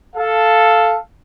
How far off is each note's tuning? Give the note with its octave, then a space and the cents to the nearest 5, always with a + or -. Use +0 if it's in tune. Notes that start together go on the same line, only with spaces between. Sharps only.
A4 +0 F5 +0